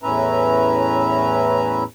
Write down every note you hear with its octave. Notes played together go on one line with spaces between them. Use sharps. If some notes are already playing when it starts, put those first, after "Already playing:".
E2 A2 C#4 B4 E5 A#5